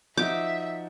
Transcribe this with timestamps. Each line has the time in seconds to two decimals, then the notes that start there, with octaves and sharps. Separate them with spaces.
0.17 F3 D#4 F#4 E5 D6 G6